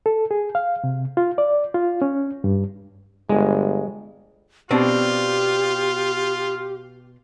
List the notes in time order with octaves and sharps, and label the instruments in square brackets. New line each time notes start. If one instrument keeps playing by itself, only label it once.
[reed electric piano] A4
G#4
F5
C3
F4
D5
F4
C#4
G2
[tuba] G1 [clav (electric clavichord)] G#3
[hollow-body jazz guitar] B2 C4 D4 [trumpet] F4 [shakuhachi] G4